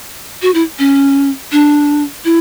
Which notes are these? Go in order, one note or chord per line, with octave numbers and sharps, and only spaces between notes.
F#4
E4
C#4
D4
E4